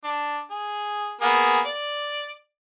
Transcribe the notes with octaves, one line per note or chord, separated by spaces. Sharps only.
D4
G#4
A#3 B3 G#4
D5